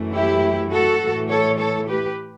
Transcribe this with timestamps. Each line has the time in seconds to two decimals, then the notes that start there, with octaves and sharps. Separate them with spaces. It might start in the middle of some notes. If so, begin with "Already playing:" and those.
Already playing: F#2 E3 A3
0.12 E4 G4
0.70 F#4 A4
1.00 A2 E3 A3
1.29 A4 C#5
1.58 A4 C#5
1.87 G4 B4